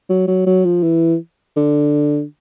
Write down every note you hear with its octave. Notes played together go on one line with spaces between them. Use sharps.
F#3
F#3
F#3
F3
E3
D3